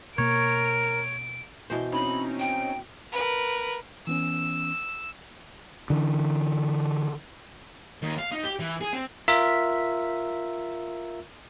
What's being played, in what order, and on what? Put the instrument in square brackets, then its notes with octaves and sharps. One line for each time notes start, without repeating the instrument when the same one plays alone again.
[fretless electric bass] B2 A#3 [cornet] A#4 [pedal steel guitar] C#5 [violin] D7
[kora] B2 E3 C5 [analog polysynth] G6
[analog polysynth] C4 C#4 D#4 [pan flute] B5
[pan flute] G5
[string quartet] A#4 B4
[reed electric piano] E3 B3 C#4 [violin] E6
[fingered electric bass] D3 E3
[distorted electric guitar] D#2
F5
D#4
G4
E3
G#4
C4
[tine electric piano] F4 A#4 E5 B6